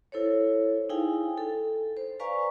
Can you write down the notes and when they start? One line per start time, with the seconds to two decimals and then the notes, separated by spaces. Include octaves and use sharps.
0.12 E4 A4 C5 C#5
0.89 D#4 E4 G#4 F5 G5 G#5
1.37 A4
1.97 C5
2.20 B4 D5 F5 G#5 A#5 C#6